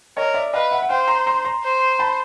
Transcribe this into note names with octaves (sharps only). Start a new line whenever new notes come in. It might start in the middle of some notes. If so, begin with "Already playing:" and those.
A#4 C#5 D#5
D5 E5
B4 D#5 F5
E5 F#5
F#5
C5 F5 G5
A#5 C6
A#5 C6
A#5 C6
C5
A5 B5